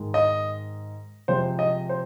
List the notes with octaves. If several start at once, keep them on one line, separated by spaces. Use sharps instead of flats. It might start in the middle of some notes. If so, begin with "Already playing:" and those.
Already playing: G#2 D#3 G#3
D#5
F2 C3 F3 G#3 C5
D#5
C5